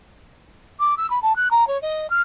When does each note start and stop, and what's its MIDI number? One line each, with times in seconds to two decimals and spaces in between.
0.80 0.97 86
0.97 1.09 88
1.10 1.19 83
1.23 1.36 81
1.36 1.49 90
1.51 1.67 82
1.68 1.80 73
1.82 2.10 75
2.10 2.21 89